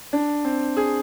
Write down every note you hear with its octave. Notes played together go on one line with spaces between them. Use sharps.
D4
C4
G#4